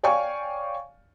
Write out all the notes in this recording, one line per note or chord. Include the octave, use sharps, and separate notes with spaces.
C#5 D5 F5 G5 G#5 C#6